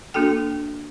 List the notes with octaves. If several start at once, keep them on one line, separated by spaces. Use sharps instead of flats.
A#3 D4 F#4 A4 G5